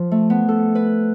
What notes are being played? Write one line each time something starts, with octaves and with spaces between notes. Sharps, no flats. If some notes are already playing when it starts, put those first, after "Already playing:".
Already playing: F3
A3
B3
A4
B4